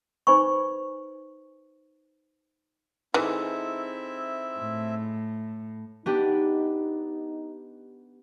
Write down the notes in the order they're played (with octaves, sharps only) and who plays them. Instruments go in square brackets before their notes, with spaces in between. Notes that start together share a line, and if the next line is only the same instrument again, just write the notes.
[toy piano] D#4 B4 C5 G#5 B5 C#6
[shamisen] E3 [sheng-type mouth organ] C4 E4 E5 [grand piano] D#4 G#4 A4
[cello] A2
[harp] B3 D4 G4 [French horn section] D#4